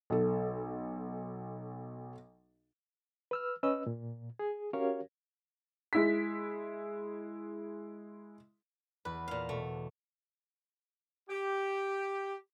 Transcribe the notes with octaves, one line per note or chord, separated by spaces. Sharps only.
B1 A4
B4 E6 F6
C#4 B4 D#5 E6
A#2
G#4
C#4 F#4 G4 A#4 C#5 F5
G#3 E4 B6
E2 B4
A#2 F5
B2 A3
G4